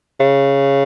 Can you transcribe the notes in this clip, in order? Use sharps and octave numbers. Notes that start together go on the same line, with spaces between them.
C#3